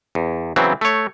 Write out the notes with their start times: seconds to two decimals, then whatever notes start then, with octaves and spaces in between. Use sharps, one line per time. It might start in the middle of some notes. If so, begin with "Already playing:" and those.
0.15 E2
0.56 C#3 E3 F#3 B3 C4
0.81 A3 C#5